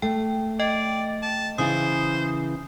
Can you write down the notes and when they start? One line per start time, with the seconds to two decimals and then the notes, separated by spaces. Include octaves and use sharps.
0.02 A3 G5
0.60 D5 D#5 G5
1.22 A5
1.58 C#3 E3 E4 C5 D#6